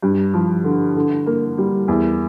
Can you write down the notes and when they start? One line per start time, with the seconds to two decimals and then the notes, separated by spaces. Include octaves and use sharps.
0.02 G2
0.34 F3
0.64 D3
0.96 D3
1.26 A#3
1.58 G3
1.88 E2